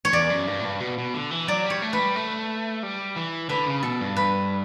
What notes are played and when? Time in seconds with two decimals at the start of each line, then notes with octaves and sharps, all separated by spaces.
0.05 C#5
0.13 E2 D5
0.30 F#2
0.47 G2
0.60 A2
0.64 G2
0.80 B2
0.98 B2
1.14 D3
1.31 E3
1.47 F#3 D5
1.64 G3
1.70 C#5
1.82 A3
1.93 B4
1.99 G3
2.16 A3
2.83 G3
3.16 E3
3.49 D3 B4
3.66 C#3
3.83 B2 A4
4.01 G2
4.16 B4